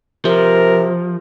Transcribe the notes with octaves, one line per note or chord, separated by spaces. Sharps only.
C3 F3 A#4